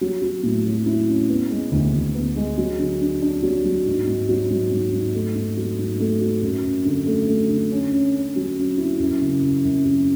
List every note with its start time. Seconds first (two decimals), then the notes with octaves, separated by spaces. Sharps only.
0.01 F#3
0.22 F#3
0.43 A2
0.65 F#3
0.86 E4
1.08 C#4
1.29 B3
1.50 G#3
1.72 D2
1.94 D2
2.15 B3
2.36 G#3
2.58 F#3
2.79 D3
3.01 D4
3.22 D4
3.43 F#3
3.64 F#3
3.86 G#2
4.07 G#2
4.29 F#3
4.50 G#2
4.72 G#2
4.93 G#2
5.14 A3
5.35 G#2
5.57 F#3
5.79 G#2
6.00 A3
6.21 F#3
6.42 F#2
6.64 F#2
6.85 D3
7.06 A3
7.28 A3
7.49 D3
7.72 C#4
7.92 C#4
8.14 C#4
8.36 F#3
8.57 C#4
8.77 E4
8.99 F#2
9.21 C#3
9.42 F#2
9.64 F#2
9.85 F#2